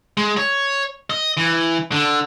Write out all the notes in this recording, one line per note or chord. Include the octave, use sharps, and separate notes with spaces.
G#3
C#5
D#5
E3
D3